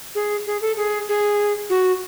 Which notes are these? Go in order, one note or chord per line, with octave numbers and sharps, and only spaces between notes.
G#4
G#4
A4
G#4
G#4
F#4